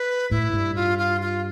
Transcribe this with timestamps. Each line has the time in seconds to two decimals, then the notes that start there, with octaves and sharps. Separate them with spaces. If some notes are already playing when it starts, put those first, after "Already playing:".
Already playing: B4
0.31 A2 E4
0.53 G2
0.76 F4
0.98 F4
1.21 F4